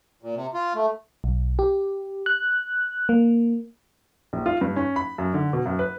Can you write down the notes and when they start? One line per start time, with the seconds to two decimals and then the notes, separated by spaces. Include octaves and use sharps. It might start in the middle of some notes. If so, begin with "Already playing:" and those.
0.23 A#2
0.35 C3
0.54 F4
0.75 A3
1.24 B1
1.59 G4
2.26 F#6
3.09 A#3
4.33 A#1
4.46 F4
4.61 G2
4.76 C#4
4.96 B5
5.18 F#2
5.34 D3
5.53 B2
5.66 F#2
5.79 B4